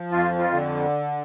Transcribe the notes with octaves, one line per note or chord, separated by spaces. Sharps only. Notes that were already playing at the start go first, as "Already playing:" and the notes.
Already playing: F3
F2 F4
F4
D3